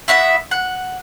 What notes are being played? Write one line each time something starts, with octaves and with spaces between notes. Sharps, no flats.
E4 F#4 E5 D#6
F#5